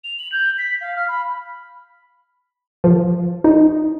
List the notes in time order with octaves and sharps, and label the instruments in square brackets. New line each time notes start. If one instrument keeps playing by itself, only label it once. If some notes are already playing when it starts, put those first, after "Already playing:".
[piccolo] F7
F#7
G6
B6
F5
F6
B5
[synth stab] F3
D#4